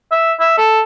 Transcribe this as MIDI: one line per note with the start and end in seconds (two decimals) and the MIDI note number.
0.12 0.33 76
0.40 0.55 76
0.58 0.81 69